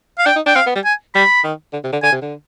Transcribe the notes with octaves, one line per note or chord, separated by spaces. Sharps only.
F5
D4 G5
D#4
D4 G5
C4 F5
B3
G3
G#5
G3 B5
D#3
D3
C3
D3
D3 G#5
C3
D3